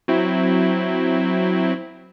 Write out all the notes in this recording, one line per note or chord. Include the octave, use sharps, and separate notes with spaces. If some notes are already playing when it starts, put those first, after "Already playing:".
F#3 C4 E4